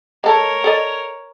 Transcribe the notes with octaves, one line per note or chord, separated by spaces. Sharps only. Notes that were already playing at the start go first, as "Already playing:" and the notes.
G#3 A4 A#4 C#5
A4 D5 D#5